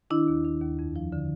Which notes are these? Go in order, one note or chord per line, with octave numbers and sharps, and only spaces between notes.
D#3 D4 E4
D#2
D#3
D#2
F2
F3
D3